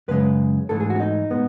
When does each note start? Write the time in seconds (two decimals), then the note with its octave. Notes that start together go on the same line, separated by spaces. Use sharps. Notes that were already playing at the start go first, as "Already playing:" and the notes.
0.08 F#2 C#3 G#3 B4
0.69 G#2 E3 A3 A4
0.80 G#4
0.90 F#4
0.95 C#4
1.00 D#4
1.31 A2 G#3 B3